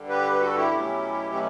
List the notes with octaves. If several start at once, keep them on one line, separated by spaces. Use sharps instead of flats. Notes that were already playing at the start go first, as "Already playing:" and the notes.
Already playing: G2 D3 G3
G4 B4
G4
F#4 A4
E4 G4
B2 F#3 A3 C#4
C#4